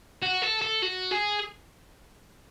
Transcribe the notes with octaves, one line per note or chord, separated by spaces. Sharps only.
F#4
A4
A4
F#4
G#4